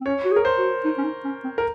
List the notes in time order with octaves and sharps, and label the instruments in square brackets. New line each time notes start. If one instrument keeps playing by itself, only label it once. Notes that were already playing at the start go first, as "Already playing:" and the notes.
[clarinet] C4
[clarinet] C#4 [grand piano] C#5
[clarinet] F#4
G#4
[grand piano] A#4
C5
[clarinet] F#4
D#4
C#4
D#4
C#4
C4
[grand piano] A#4